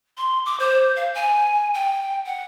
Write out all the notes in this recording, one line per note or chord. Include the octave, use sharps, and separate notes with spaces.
C6
D6
C5
F5
G#5
G5
F#5